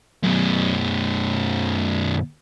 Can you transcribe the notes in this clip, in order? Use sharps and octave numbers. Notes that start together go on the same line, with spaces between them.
F#2 B2